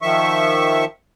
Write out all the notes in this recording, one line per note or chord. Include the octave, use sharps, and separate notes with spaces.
D#3 F3 E5 C#6